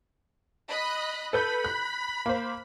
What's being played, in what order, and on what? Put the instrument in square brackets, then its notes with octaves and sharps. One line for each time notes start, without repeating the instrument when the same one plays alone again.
[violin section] D#5 B5 F#6
[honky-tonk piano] A4 B4 G6 [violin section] B5
[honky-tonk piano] F#6
A#3 C5